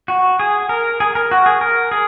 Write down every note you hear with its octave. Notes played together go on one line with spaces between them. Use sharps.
F#4
G#4
A#4
G#4
A#4
F#4
G#4
A#4
G#4